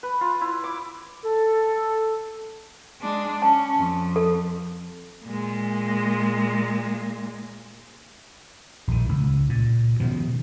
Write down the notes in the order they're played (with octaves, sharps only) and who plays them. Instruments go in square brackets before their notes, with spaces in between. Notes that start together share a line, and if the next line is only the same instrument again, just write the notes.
[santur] B4
F4
E4
D6
[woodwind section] A4
[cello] G#3 D4
[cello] C#4 [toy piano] A5
[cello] F2
[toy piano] A4
[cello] A#2 G#3
[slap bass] A#1 D#3
C#2
A#2
B2 D#3 F3